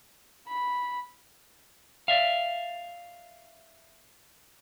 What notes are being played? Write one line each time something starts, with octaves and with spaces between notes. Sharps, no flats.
B5
D5 E5 F5